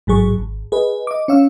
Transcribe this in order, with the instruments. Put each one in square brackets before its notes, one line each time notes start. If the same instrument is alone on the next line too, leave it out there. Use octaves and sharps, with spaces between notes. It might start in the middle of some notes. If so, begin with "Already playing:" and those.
[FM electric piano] A1 G#2 F#3 G#4 C#6
G#1
G#4 B4 D#5
D#5 D6
C#4 C#5 F5 E6